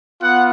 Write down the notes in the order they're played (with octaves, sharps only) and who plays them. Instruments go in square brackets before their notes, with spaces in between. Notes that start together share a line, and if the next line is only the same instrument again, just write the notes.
[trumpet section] B3 F4 F#5